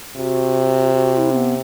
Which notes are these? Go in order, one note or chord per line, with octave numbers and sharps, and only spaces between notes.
C3 F#4
F#4
F#4
E4
C4
B3